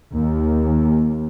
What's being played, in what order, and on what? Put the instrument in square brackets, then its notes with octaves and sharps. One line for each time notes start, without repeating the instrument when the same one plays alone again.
[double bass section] D#2